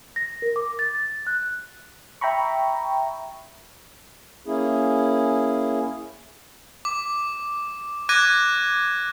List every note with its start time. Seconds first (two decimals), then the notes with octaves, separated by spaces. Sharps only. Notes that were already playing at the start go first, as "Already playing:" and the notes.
0.16 A#6
0.42 A#4
0.56 D6
0.79 A6
0.95 A6
1.27 F#6
2.21 E5 G5 A#5 B5 C#6
4.45 A#3 C#4 E4 G#4
6.85 D6
8.09 D6 F#6 G#6 A#6 D#7